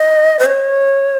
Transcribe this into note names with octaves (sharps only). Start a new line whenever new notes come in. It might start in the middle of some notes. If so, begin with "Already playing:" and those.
Already playing: D#5
C5
C#5